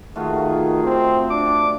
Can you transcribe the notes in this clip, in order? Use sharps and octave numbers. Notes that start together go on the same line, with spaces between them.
D#3 A3 F4 F#4 G#4
C4
D4 D6